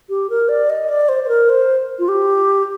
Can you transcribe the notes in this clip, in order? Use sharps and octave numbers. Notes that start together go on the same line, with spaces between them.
G4
A#4
D5
D#5
D5
C5
C5
A#4
C5
F4
G4